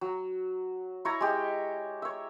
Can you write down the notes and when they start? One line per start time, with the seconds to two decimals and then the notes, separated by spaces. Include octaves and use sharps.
0.01 F#3
1.05 E4 C#5 A#5
1.20 G#3 G4
2.02 C#5 E5